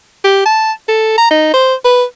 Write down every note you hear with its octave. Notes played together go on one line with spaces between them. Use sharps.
G4
A5
A4
A#5
D#4
C5
B4